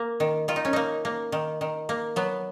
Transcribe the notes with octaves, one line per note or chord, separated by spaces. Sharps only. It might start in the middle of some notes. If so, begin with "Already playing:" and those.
Already playing: A#3
D#3
D#3 F4
D#4
C#4
A#3 D#4
A#3
D#3
D#3
A#3
F#3 B3